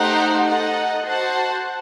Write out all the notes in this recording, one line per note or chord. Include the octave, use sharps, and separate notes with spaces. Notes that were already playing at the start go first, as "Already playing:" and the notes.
Already playing: A3 D#4 G4 C5 F#5
D#4 A4 D#5 F#5
F#4 C5 F#5 A5